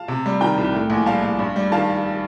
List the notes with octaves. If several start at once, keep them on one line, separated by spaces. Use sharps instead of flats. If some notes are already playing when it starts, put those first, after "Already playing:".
Already playing: F5 A5
C3
G3
D#3 G5 A#5
C2
A2
A#1
G3 F5 A5
A#1
G2
G3
D#3 F5 A5